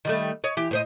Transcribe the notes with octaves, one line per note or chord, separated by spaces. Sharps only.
D#3 G3 A3
C#5 D#5
E3 G4
A2 C5 D#5